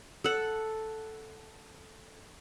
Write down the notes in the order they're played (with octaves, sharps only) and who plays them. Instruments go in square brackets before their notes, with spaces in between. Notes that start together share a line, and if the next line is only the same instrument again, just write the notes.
[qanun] A4 F#5